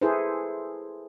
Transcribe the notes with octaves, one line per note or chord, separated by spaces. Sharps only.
E4 G#4 A4 B4 C5